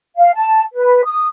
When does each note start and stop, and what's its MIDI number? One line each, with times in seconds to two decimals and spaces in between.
0.18 0.31 77
0.35 0.62 81
0.74 1.02 71
1.06 1.26 87